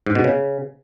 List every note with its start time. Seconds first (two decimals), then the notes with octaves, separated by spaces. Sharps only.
0.06 G#2
0.15 B2
0.24 C#3